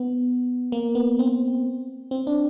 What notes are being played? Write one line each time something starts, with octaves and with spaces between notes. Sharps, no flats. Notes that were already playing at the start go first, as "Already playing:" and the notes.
Already playing: B3
A#3
B3
C4
C4
D4